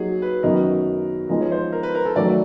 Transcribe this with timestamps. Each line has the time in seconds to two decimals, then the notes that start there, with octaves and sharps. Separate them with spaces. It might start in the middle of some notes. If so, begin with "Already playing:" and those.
Already playing: F#3 A#3 D#4 G#4
0.22 B4
0.43 F#2 D#3 F#3 B3 D#4 A#4
1.29 F3 G#3 B3 D#4 G#4 A#4
1.41 C#5
1.52 C5
1.72 A#4
1.83 B4
1.95 A#4
2.05 A4
2.16 D#3 F#3 A3 D5